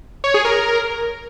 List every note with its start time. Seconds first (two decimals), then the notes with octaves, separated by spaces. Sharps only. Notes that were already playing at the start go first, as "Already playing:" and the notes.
0.24 C#5
0.34 G#4
0.45 A#4